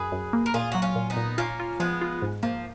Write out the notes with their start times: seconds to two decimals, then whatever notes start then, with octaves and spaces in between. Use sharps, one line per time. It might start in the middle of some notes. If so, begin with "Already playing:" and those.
Already playing: F#2 G#4 B4
0.12 F#2
0.33 A#3
0.46 A#4
0.54 A#2 F4 G#4
0.72 F#3 F#4
0.82 C#4 F4
0.95 A#2
1.10 B3 D#4
1.16 A#2
1.38 A#3 C#4 F4
1.60 F4
1.80 F3 G#3 B3
2.01 F4
2.22 G#2
2.43 F3 A#3